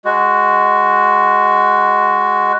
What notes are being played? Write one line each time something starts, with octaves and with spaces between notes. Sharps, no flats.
G#3 F#4